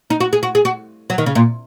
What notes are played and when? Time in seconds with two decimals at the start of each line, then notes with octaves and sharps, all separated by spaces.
0.10 D#4
0.20 F#4
0.33 G#4
0.43 F#4
0.55 G#4
0.65 F#4
1.10 F#3
1.18 D#3
1.26 C#3
1.35 A#2